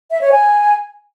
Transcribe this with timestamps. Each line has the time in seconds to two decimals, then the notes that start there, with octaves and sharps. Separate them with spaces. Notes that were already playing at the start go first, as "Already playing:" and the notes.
0.11 E5
0.21 C#5
0.32 G#5